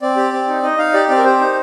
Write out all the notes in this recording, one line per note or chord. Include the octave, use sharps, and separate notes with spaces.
C4 D5
G4
C4
D#4
D#4 D#5
D#4 F5
G4 D5
C4 D5
A#4
G4 C5
D#4